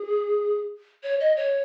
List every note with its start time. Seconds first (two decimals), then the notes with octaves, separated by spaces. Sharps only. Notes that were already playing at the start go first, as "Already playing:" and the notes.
Already playing: G#4
1.03 C#5
1.20 D#5
1.37 C#5